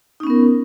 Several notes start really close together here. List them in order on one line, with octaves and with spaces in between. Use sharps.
D#4 C#4 B3 A#4